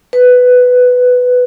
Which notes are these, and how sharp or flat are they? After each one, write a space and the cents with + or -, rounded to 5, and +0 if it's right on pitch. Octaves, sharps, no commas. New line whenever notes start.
B4 +10